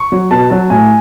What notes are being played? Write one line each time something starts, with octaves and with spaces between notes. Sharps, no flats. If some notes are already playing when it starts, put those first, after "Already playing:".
Already playing: C#6
F#3
B2 A5
F#3 A5
A2 G#5